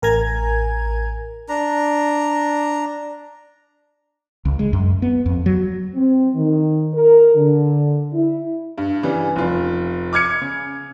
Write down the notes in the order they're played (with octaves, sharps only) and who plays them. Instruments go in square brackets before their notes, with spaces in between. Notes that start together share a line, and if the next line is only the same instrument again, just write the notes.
[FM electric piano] A1 A#4 G#5 A#5 G#6
[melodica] D4 A#5
[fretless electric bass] C#2
G#3
F#2
B3
F2
F#3
[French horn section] C4
D#3
A#4
D3
E4
[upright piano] G2
C#3 E3 G3
F1 F4
D6 F6 G#6 C#7
C#3